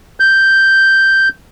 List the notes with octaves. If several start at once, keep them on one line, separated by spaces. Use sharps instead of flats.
G6